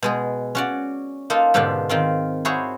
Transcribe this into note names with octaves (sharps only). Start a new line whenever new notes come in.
B2 G#3 G#4
C#4 F#4 D5
A#3 D#4 F4 A4
G#2 B2 D3 D4 F4 G4
D#3 C4 F4
E4 F#4 G#4 C5 C#5